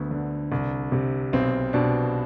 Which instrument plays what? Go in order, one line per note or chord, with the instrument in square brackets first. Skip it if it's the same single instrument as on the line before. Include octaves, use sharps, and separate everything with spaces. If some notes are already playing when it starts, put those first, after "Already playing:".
Already playing: [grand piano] D2 B3
D3
C2
C3
B1 C4
B2 D4